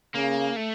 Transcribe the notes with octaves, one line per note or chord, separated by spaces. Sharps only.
C#3 A#3
A3